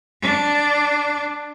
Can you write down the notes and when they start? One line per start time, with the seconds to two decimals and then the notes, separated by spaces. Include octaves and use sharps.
0.21 D4